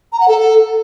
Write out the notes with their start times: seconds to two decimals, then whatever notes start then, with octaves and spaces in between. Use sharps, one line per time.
0.13 A#5
0.20 F#5
0.28 A4